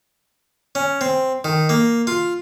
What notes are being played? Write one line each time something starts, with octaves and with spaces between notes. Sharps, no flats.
C#4
C4
D#3
A#3
F4